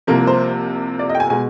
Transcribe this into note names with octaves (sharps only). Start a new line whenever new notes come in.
C2 C3 F3 A#3 A#4
C5
D5
D#5
G5
G#5
B2 G#3 G#5